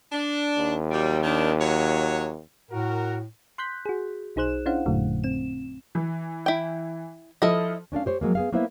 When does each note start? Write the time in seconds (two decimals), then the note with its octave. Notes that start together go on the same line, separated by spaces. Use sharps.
0.12 D4
0.58 D#2
0.91 F#3 G3
1.23 A2 D#3 D4
1.60 F#3 C#5 F#5
2.71 A2 F#4 A#4
3.58 C6 F#6 G6 B6
3.86 F#4 G#4
4.36 B1 D#4 G#4 C5 F#6 E7
4.66 C#4 D4 E4 C5 F5 F#5
4.86 A1 F#2 A#2 D3 F#3 A3
5.24 C4 E7
5.95 E3
6.46 E4 G5
7.42 F3 E4 A4 D#5
7.92 C#4 D4 A4 F5
8.06 G4 C5 C#5
8.21 F3 F#3 G#3 A#3
8.35 B3 G#4 F5
8.52 A#3 B3 E4 C5 C#5 E5